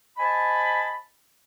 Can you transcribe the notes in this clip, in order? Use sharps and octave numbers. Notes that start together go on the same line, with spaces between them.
C5 D#5 G#5 A5 B5